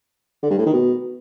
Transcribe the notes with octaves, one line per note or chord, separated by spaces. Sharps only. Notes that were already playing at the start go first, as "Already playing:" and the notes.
D3
G2
A2
D#3
B2